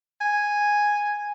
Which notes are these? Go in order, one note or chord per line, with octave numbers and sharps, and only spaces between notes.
G#5